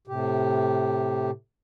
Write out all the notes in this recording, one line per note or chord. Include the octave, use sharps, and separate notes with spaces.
A2 C3 G4